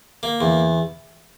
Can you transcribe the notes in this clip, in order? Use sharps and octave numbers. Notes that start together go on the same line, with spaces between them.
A#3
E2